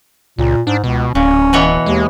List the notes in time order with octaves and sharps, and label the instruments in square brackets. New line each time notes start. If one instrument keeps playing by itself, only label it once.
[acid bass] C#2 [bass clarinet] A#2
[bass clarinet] G#2 [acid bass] D4
[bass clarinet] C#2 [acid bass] B2
[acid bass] D1 [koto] A#2 [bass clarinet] C#4
[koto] B2 E3 C#5
[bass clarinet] D#2 [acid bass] G#3